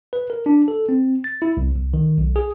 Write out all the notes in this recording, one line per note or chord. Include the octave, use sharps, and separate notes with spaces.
B4
A#4
D4
A4
C4
A6
E4
C2
C2
D#3
B1
G#4